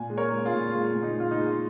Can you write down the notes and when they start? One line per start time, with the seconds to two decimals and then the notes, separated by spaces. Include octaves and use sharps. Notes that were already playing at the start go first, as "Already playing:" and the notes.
Already playing: A#2 G#5
0.10 G#3
0.17 A#4 C#5
0.32 G#3
0.45 F4 G#4
0.53 A#2
0.74 G#3 F4
0.95 A#2
1.03 D#4
1.17 G#3 F4
1.31 D#4
1.38 G#3